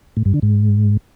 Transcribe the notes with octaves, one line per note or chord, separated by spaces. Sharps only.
A2
G2
D3
G#2